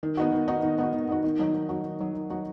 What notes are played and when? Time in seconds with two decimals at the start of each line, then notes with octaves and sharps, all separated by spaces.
0.03 D#3
0.17 B3 D#4 F#4
0.32 D#3
0.48 B3 D#4 F#4
0.63 D#3
0.78 B3 D#4 F#4
0.93 D#3
1.09 B3 D#4 F#4
1.24 D#3
1.39 F#3 D#4 F#4
1.54 D#3
1.69 F#3 D#4 F#4
1.85 D#3
2.00 F#3 D#4 F#4
2.14 D#3
2.30 F#3 D#4 F#4